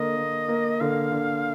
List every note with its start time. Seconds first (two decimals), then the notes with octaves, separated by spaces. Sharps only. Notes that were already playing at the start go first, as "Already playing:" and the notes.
Already playing: D3 A#3 D#5
0.16 A#3
0.48 A#3
0.81 D3 F5
1.12 D3